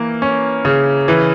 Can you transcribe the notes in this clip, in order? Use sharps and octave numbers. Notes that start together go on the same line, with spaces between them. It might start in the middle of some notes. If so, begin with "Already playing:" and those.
Already playing: E3 A#3
C#4
C#3
E3